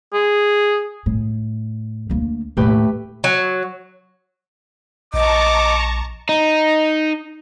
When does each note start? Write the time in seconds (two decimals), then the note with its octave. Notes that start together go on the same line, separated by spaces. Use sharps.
0.14 G#4
1.06 A2
2.10 D2 A#3
2.57 D#2 A2 A3 G4 B4
3.24 F#3
5.14 A#1 D#5 A5 A#5 C#6 D6
6.29 D#4